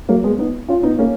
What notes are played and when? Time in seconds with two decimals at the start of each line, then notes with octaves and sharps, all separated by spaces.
0.09 F#3 A#3
0.24 G#3 B3
0.39 B3 D#4
0.68 C#4 F4
0.83 B3 D#4
0.99 A#3 C#4